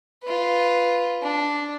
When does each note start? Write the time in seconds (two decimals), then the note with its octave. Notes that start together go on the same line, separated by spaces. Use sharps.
0.23 F4 B4
1.22 D4